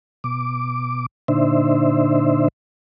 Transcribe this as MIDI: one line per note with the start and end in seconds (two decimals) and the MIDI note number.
0.24 1.06 47
0.24 1.06 86
1.28 2.48 46
1.28 2.48 50
1.28 2.48 62
1.28 2.48 63
1.28 2.48 72
1.28 2.48 76